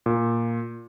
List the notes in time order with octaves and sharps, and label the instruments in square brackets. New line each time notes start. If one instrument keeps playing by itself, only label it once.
[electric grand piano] A#2